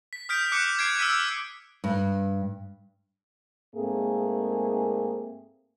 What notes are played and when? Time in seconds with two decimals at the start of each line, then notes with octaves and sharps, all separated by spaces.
0.13 B6
0.29 D#6 F6 G6 B6 D7
0.52 D6 F#6 C#7
0.79 G#6 C7 D7
0.99 E6 F6 B6 D#7
1.84 G2
3.75 G#2 A3 A#3 C4 G#4